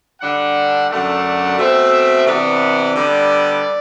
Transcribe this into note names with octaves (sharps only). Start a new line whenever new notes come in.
D3 G3 D4 F#5
F#2 D3 A3 D4 F#5
B2 A3 C4 E5
C3 E3 B3 D4 D5
D3 G3 B3